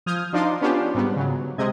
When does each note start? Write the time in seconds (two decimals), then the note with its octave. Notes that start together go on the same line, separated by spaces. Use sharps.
0.06 F3 D#6 F6 G6 G#6
0.33 F3 D4 D#4 F4 C6 D6
0.61 B3 C#4 D4 F4 G4
0.94 G#2 G3 B3
1.16 C#3 F#3
1.58 C3 G#3 C4 D#5 G#6